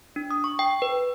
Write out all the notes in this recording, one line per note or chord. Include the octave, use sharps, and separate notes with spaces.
D4
D#6
C#6
G5
B4